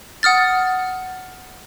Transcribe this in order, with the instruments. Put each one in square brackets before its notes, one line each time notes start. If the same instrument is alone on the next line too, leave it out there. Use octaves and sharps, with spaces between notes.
[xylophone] F#5 D#6 F6 A6